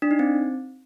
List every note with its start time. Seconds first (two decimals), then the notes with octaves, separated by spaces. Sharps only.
0.02 D4
0.11 D#4
0.19 C4